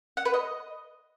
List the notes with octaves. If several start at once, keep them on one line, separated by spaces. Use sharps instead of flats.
F#5
B4
D#5